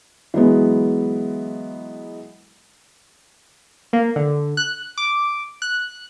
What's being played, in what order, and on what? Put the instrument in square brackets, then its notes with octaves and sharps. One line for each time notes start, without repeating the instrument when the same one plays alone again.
[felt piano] E3 F#3 G#3 B3
[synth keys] A#3
D3
F#6
D6
F#6